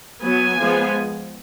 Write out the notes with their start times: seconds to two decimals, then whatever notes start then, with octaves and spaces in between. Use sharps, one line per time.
0.23 F#3 B3 G#5
0.60 F3 G#3 B3